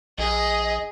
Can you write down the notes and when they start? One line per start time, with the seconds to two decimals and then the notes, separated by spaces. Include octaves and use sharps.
0.18 A#1 G#4 D#5